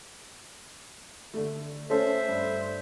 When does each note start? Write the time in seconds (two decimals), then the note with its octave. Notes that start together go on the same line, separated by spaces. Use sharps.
1.34 D3 A3
1.90 A3 C#4 A4 C5 E5
2.28 G2